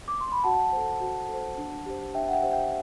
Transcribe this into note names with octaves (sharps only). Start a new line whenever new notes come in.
D6
C6
B5
F#4 F#5 A5
A4 C5
F#4
A4 C5
D4
G4 C5
D4 E5 G5
F#5
E5 G5
G4 C5
E5 G5